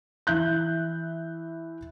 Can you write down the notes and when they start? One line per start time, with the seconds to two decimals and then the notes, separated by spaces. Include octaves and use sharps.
0.27 E3 E5 F#6 G6